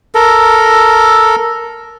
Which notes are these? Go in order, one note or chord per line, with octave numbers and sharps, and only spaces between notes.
A4 A#4